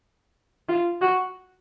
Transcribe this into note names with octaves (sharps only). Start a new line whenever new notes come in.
F4
F#4